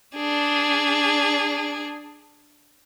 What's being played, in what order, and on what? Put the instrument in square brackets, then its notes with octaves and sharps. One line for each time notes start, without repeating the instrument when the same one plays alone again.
[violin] D4 G#4